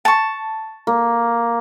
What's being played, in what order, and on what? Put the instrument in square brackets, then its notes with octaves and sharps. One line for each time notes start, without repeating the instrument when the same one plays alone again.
[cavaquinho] A5 C#6
[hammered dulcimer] A#3